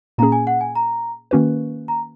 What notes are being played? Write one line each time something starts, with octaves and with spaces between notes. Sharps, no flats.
A#2 A#3 C#4 G#4 A#5
G#5
F#5
G#5
A#5
D#3 A#3 C#4 F#4 B4
A#5